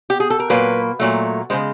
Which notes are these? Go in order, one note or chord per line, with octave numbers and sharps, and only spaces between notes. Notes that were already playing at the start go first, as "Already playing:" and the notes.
G4
G#4
A4
A#4
A#2 F#3 A#3 B4
A#2 F#3 A3
C#3 E3 G#3 C5